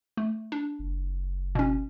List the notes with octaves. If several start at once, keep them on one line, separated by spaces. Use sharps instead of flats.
A3
D4
F#1
B2 C#4